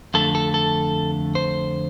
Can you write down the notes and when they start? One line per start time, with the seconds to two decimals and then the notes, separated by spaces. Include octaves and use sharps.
0.14 F2 D3 A3 A4
0.35 A4
0.54 A4
1.35 C5